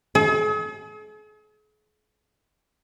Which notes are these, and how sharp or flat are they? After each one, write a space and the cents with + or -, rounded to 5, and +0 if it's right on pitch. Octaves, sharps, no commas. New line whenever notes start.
G#4 +45